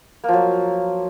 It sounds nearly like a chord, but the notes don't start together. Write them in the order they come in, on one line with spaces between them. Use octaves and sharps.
A#3 F3 F#3